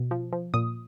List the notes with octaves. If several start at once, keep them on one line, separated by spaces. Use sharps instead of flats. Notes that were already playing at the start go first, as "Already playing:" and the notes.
Already playing: B2
F3
F3
A#2 D#6